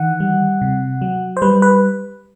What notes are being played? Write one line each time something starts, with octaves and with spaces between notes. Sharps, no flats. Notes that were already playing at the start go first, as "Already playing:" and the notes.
Already playing: D#3 E3 F#5
G3
C3
F#3
C5
G3 B4
B4